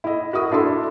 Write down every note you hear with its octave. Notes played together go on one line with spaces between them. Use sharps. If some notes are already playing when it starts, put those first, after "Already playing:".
E4 D#5
F#4 A#4 E5 D#6
D4 E4 A4 C6